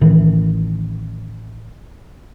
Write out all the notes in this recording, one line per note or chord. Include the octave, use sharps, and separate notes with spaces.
A1 D#3 E3